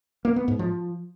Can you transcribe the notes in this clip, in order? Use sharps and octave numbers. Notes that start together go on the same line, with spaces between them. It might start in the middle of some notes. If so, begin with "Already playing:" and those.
A#3
B3
G#2
F3